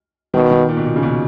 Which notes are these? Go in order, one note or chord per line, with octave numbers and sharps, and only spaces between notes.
B2 D#3
D#3
A#2
B2
A#2
C#3
B2